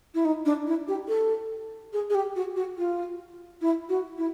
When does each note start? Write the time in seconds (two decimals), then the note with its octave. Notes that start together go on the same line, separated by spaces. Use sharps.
0.14 E4
0.25 D#4
0.45 D4
0.67 E4
0.88 G4
1.08 A4
1.93 G#4
2.10 G#4
2.15 G4
2.36 F#4
2.56 F#4
2.78 F4
3.61 E4
3.89 F#4
4.18 E4